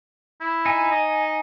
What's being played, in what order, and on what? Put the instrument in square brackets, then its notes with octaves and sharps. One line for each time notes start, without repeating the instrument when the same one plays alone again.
[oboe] E4
[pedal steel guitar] D#4 G#5
[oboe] D#5